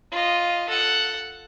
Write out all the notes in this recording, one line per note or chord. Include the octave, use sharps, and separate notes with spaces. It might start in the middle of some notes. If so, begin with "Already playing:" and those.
F4 D#5
A4 F#5